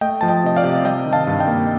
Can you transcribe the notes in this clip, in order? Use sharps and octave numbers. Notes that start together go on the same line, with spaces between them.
A3 D#5 G5
F3 A5
D#5 G5
C3 D#5
D5 F5
C3
G3 D#5 G5
D#3
F5 A5
G2
D#5 G5
A#3